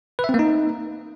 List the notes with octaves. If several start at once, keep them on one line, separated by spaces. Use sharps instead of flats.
B4
E5
C4
A#3
D#4